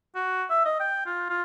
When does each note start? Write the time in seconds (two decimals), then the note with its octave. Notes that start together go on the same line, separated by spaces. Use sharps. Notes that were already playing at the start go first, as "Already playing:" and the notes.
0.15 F#4
0.50 E5
0.65 D#5
0.80 G5
1.06 F4
1.30 F4